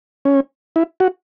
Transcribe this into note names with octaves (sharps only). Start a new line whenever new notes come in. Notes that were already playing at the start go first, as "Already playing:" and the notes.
C#4
E4
F#4